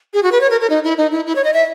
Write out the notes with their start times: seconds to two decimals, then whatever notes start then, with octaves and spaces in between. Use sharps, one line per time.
0.14 G#4
0.23 F#4
0.32 B4
0.41 C#5
0.51 A#4
0.61 A#4
0.70 D#4
0.84 E4
0.98 D#4
1.11 E4
1.26 E4
1.36 C#5
1.44 D#5
1.54 E5